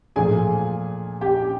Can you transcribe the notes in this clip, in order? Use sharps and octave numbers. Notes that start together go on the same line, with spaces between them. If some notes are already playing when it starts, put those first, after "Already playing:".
A#2 F3 A3 G#4 G#5
G4 G5